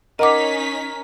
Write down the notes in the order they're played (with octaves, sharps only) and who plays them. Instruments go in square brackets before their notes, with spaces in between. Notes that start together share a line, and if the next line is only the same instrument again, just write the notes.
[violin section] C#4 D#4 B6 [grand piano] A#4 [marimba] D#5 F#5 D6